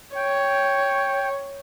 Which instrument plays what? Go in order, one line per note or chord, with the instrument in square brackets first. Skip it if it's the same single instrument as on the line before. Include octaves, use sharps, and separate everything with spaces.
[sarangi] C#5 [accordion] G5